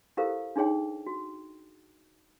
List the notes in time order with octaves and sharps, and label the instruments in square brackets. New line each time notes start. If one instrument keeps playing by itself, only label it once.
[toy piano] E4 G4 A4 A#4 C5 F5
D4 D#4 G#4 C#5 G5
F#4